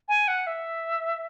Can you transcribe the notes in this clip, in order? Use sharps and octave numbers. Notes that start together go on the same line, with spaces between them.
G#5
F#5
E5